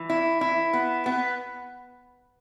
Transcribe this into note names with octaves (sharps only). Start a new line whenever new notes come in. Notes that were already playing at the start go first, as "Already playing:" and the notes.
Already playing: E3
E4
E4
B3
B3